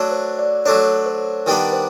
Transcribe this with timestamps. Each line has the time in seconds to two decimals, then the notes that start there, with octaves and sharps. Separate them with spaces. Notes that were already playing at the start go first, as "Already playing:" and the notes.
Already playing: F#3 A3 D4
0.12 C5
0.39 D5
0.66 F#3 A3 D4 C#5
1.06 C5
1.46 D#3 G3 B3 D4 A#4
1.73 C5